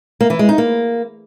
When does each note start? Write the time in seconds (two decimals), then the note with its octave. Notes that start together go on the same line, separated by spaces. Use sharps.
0.21 A#3
0.30 E3
0.39 G#3
0.49 D#4
0.58 A#3